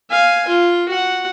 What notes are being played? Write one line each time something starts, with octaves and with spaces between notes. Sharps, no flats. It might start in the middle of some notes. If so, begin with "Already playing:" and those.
F5 G#5
F4
F#4 F#5